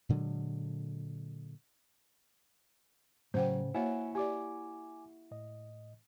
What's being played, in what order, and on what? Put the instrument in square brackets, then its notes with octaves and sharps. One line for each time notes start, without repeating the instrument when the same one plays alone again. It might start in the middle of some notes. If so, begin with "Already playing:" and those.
[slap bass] A#2 D3 F#3 G#3
[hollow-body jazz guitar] A2 C#3 [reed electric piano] F#3 [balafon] C5 F#5 G5
[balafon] A#3 C#5 [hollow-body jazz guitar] E4 F#4 [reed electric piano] E5 F#5 G#5
[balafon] G4 D5 [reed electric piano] G#5 D6
[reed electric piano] A2 D#5